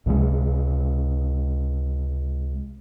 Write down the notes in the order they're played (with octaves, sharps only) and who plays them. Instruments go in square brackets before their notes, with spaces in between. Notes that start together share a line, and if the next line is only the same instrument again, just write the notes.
[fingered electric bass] C#2 C3 F#3 G#3